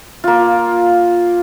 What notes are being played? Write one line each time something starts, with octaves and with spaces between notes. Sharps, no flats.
A#3 F4